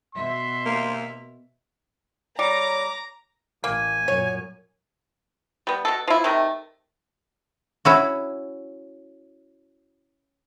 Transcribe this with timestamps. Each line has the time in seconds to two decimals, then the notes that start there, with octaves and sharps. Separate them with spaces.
0.15 B2 E5 C6
0.66 A#3
2.39 G3 C#5 A#5 D6
3.64 A1 A#3 G#5
4.08 F#2 A#2 C#5
5.67 G3 B3
5.85 B2 F#3 A4
6.08 F3 E4
6.24 C3 D#3 A3
7.85 C#4 E4 F#4